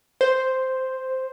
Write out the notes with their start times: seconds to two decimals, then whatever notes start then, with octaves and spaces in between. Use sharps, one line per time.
0.21 C5